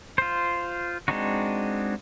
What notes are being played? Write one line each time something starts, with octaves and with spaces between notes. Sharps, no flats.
F4 C5
G#3 C4 D4 D#4 F#4